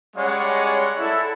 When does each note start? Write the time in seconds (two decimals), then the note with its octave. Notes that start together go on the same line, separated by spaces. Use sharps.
0.16 G3 G#3 C#4 C#5 D5 F#5
0.98 E4 A4